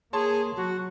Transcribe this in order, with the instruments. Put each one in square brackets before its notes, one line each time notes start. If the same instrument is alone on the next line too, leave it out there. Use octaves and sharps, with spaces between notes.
[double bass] A#3 [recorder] G#4 [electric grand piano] C#5 A5 C6
[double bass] F#3 [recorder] F#4